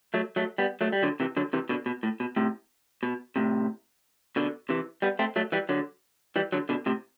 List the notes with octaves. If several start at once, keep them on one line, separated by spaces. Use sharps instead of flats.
F#3 A3
F#3 A3
G3 B3
F#3 A3
G3
D3 F#3
C3 E3
D3 F#3
C3 E3
B2 D3
B2
A2
B2
A2 C3
B2
A2 C3
B2 D3
C3 E3
G3 B3
A3 C4
F#3 A3
E3 G3
D3 F#3
E3 G3
D3 F#3
B2 D3
A2 C3